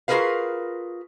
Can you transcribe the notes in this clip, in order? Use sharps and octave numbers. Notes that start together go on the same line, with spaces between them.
F4 F#4 G#4 A#4 B4 F5